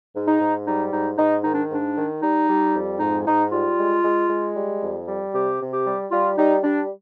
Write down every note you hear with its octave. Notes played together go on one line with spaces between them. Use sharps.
G#2
D#4
G#2
G3 D#4
G#2 D#4
G#2 D#4
D#3 D#4
D4
G#2 D4
D#3
G3 D#4
G3
F2
G#2 D#4
G#2 D#4
G3 F4
G#3
G#3
G#3
G3
F2
G3
C3 G4
C3
G4
G3
G3 F4
G3 D#4
G3 D4